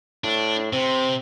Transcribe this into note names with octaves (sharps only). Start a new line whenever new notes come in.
A2 D4
C3 C4